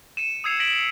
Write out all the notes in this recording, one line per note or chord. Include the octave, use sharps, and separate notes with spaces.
C#7 D#7 E7
D#6 E6 G#6 C7 C#7 F7
A#6 B6 D7 F#7